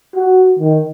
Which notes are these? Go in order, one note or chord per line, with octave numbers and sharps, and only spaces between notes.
F#4
D#3